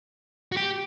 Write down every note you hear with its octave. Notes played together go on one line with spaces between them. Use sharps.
F#4
G4